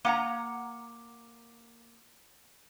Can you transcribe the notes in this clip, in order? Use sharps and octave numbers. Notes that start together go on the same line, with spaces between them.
A#3 F#5 A#5